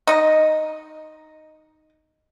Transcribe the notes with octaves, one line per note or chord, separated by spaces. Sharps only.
D#4 D#5